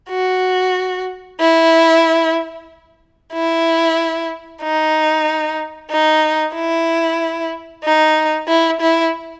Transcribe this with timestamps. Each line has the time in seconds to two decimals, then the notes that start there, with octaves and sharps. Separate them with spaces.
0.10 F#4
1.39 E4
3.33 E4
4.62 D#4
5.90 D#4
6.54 E4
7.84 D#4
8.48 E4
8.81 E4